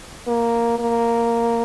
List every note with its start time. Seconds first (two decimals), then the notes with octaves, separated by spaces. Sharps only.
0.27 A#3
0.79 A#3